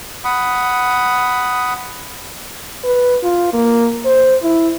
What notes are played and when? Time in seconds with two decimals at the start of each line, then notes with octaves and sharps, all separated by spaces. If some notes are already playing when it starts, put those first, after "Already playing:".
0.25 F#5 B5 D#6
2.84 B4
3.23 F4
3.54 A#3
4.05 C5
4.43 E4